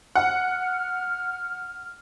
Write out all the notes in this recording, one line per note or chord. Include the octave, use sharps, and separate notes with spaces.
F#5 F6